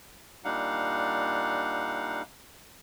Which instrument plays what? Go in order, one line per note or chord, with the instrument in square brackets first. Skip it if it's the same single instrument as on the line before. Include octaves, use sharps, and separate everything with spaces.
[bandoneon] A#2 G3 D4 D#4 F5 F#5